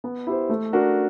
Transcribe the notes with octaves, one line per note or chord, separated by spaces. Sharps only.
B3
E4 G4 C5
A3
D4 F#4 A#4